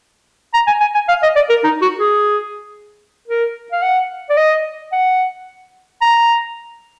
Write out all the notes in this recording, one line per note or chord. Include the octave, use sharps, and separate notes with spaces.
A#5
G#5
G#5
G#5
F5
D#5
D5
A#4
D#4
F#4
G#4
A#4
F5
F#5
D5
D#5
F#5
A#5